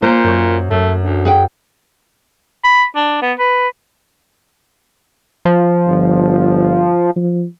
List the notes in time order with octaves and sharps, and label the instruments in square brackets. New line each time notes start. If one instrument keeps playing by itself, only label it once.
[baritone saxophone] A#2 [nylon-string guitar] A#3 [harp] C5 G6
[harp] F#2 C#6
[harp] F#2 [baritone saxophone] A3
[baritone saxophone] D2
[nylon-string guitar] G#4 F#5 G5
[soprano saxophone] B5
D4
B3
B4
[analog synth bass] F3
[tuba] G1
F3